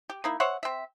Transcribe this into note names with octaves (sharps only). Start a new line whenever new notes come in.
G4
A#3 D#4 E4
C5 C#5 E5 F#5
C4 E5